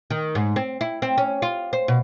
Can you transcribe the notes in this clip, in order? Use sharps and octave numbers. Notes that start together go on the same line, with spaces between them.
D#3
G#2
C4
E4
C4
C#4
F4
C5
B2